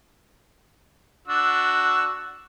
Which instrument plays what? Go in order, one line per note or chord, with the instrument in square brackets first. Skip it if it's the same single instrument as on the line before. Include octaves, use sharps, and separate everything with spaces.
[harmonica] D4 F#4 E6